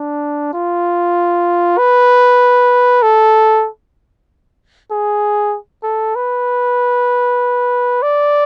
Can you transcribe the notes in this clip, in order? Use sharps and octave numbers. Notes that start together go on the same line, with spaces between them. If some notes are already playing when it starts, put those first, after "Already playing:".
Already playing: D4
F4
B4
A4
G#4
A4
B4
D5